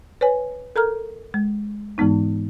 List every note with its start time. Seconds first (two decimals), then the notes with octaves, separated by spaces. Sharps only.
0.21 B4 C#5 G#5
0.76 A4 A#4 A#5 F6
1.34 G#3
1.98 G#2 E3 G#3 B3 D#4